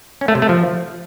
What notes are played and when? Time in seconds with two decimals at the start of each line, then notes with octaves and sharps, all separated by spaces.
0.21 C#4
0.28 A3
0.35 C3
0.42 A3
0.49 F3